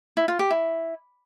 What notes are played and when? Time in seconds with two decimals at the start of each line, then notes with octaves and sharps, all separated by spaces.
0.17 E4
0.28 F4
0.39 G4
0.51 E4